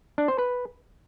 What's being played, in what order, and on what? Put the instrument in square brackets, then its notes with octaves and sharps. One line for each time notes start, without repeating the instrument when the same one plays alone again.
[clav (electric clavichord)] D4
C5
B4